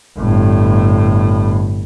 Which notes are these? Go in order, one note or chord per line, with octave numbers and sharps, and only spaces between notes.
G1 A2